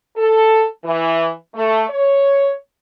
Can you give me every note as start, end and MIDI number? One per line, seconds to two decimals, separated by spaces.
0.16 0.65 69
0.84 1.29 52
1.55 1.83 57
1.88 2.52 73